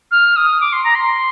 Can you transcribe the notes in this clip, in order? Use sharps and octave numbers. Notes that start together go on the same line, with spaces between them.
F6
D#6
D6
C6
A#5
C6